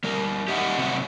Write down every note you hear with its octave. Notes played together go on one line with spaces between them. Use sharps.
G3 A#4
G4 D#5 E5 F#5
C3 F#3 C4 F#5